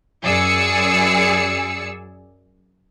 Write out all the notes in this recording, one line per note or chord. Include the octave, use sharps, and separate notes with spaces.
F#2 G#4 D5 E6 C#7